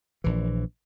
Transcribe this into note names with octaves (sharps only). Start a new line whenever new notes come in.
A#1 E3